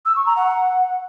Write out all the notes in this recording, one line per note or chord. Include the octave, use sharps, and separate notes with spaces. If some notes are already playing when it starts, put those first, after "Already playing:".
E6
C#6
A#5
F#5